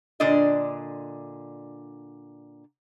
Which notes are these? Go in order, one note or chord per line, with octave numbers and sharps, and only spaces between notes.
A#2 D3 D4 D5 D#5